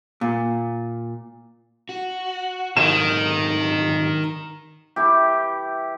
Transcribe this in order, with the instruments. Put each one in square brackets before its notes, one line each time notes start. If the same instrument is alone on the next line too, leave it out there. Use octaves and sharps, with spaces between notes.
[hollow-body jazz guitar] A#2
[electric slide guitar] F#4
[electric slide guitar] G#2 D3 F#3 [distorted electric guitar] D#3 [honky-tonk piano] E7
[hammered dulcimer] E3 E4 G4